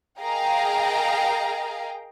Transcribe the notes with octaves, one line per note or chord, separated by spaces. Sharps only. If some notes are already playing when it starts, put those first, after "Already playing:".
G#4 A#4 D#5 F5 G5 A#5